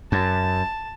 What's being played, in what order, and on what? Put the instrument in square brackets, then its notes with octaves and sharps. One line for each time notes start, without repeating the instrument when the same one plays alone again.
[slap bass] F#2 [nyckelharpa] A5